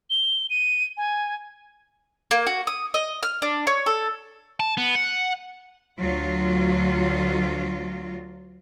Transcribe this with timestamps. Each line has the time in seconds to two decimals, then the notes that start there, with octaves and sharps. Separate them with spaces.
0.10 G7
0.50 D#7
0.97 G#5
2.31 A#3
2.47 F#4
2.67 D#6
2.94 D#5
3.23 F6
3.42 D4
3.67 C#5
3.86 A4
4.60 A5
4.77 B3
4.95 F#5
5.99 D2 F#3 F4